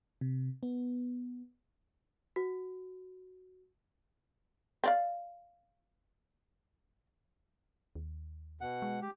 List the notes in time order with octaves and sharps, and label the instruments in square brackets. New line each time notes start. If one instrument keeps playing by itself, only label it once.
[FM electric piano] C3
B3
[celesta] F#4
[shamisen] C4 D5 F5
[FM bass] D#2
[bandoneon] B2 F#5
[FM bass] G#3
[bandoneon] G4